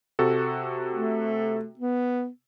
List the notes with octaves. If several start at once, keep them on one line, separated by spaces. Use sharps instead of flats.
C3 F#4 A4
A3
B3